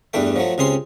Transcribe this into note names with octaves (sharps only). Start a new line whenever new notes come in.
E2 G2 E3 A3 G5
F3 F#3 A3
C#2 C3 C#4 G#4 C6